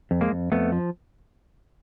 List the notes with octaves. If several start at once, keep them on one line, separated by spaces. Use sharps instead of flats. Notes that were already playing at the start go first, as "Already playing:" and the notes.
F2
G#3 A#3
F2
F2 A3 B3
F3